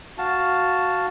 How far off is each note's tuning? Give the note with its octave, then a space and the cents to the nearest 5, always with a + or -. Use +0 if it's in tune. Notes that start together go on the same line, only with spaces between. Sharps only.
F#4 +0 F5 +0 A5 +0